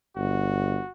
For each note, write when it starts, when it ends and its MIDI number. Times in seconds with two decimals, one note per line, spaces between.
0.16 0.79 31
0.16 0.92 66